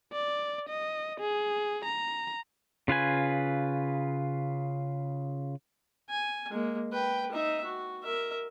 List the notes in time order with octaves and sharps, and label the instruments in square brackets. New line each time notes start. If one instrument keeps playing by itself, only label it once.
[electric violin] D5
D#5
G#4
A#5
[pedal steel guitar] C#3 F4 B4 G#5
[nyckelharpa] G#5
G#3 A#3
B4 G5
D#4 E5
F#4
A#4 E5